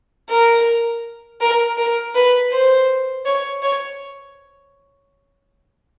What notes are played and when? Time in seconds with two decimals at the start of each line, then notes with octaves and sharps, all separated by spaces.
0.29 A#4
1.41 A#4
1.77 A#4
2.15 B4
2.51 C5
3.25 C#5
3.63 C#5